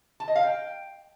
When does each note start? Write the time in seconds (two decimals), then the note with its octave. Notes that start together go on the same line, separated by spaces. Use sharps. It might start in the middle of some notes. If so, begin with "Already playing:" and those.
0.20 A5
0.28 D#5
0.35 F5
0.43 G5